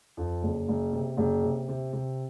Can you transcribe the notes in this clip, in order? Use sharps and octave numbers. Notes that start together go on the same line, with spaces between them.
F2
F#1
F#1
C3
F#1
C3
C3
C3